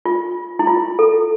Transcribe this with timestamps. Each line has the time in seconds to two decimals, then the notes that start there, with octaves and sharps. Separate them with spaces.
0.05 F4
0.59 E4
0.67 F4
0.99 A4